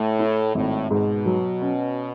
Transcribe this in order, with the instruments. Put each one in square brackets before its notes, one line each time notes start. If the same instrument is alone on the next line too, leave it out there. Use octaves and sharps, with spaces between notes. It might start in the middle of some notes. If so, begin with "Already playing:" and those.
Already playing: [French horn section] A2 [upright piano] A3
[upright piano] E4
[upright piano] G#1 [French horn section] A2
[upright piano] G#2 [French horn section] B2
[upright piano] F#3
C#4